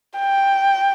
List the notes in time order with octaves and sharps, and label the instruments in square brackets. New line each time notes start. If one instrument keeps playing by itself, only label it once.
[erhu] G5